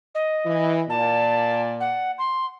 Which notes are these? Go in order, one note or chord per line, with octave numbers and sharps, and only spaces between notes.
D#5
E3
A#2 D5 A5
F#5
C6